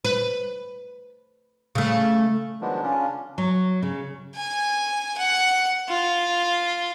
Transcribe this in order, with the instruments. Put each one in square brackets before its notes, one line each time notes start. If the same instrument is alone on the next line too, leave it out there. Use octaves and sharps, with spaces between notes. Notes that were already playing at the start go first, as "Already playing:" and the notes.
[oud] B4
C#3 A3
[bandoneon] D#3 F3 F#3 G#3 B3 D4
C#3 C#4 D4 F4
[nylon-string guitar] F#3
C#3
[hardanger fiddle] G#5
F#5
F4